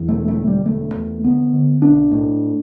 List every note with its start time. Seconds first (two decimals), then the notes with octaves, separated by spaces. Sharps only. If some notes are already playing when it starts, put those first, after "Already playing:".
Already playing: E2
0.08 E1 A3
0.28 A3
0.37 D2
0.47 G3
0.66 E1 A3
0.95 E2
1.24 D2 B3
1.53 D3
1.82 B1 D4
2.11 A2